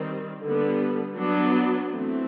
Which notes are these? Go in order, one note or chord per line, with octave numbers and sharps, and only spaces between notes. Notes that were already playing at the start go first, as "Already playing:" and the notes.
Already playing: D#3 G3 C4
D3 G3 B3
F#3 B3 D4
E3 A3 C4